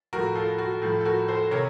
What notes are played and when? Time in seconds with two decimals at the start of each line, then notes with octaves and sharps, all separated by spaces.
0.13 A2 F3 F#4 A#4
0.35 F4 A4
0.58 F#4
0.82 A2 F3
1.01 A4
1.05 F#4 A#4
1.28 A4 C5
1.51 C3 A#4 C#5